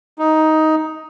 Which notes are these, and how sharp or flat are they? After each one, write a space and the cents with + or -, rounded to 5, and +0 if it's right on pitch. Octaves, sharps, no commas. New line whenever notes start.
D#4 +10